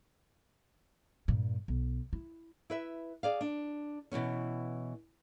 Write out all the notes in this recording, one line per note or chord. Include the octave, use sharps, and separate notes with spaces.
G2 A#2
B1
E4
E4 B4 E5
G#4 D5 F5
D4
B2 E3 B3 C#4